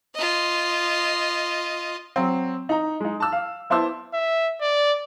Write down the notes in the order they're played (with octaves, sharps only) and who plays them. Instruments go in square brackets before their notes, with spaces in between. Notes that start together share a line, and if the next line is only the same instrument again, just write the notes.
[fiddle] F4 D#5
[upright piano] F#3 C4
D#4 A#5
G#3 D#4
A5 E6
F5
B3 E4 C5 A5 E6
[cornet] E5
D5